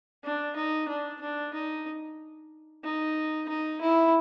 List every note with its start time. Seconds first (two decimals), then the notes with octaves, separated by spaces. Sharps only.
0.24 D4
0.56 D#4
0.88 D4
1.21 D4
1.54 D#4
2.83 D#4
3.49 D#4
3.81 E4